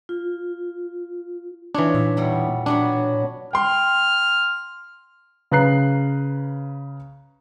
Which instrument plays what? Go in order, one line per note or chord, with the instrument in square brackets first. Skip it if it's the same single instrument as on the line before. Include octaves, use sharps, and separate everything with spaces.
[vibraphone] F4
[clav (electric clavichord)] E3 D4 [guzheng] D#4 F4 C#5
[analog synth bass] A#2 [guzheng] E5
[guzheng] E2 B2 G3
[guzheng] F#3 B3 F#4 [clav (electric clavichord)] D4
[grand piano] G5 C6 [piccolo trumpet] F6
[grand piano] C#3 B4 A#5 F#6 C7